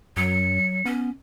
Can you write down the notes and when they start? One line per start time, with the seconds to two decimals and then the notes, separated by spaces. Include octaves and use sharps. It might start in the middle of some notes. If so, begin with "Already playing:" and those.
0.17 F#2 F#3 C#7
0.85 B3 C#4